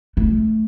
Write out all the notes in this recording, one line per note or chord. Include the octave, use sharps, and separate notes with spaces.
A3